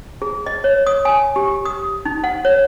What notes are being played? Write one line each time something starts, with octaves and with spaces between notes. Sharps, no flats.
G#4
D#5
C#5
D#6
G#5
G4
D#6
D#4
F#5
C#5